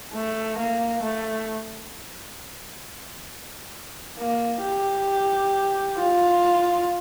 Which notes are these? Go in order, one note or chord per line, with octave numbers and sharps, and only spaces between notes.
A3
A#3
A3
A#3
G4
F4